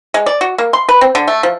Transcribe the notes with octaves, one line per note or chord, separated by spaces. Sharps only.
G#3
D5
F#4
A#3
C6
B4
C4
D3
A3
F3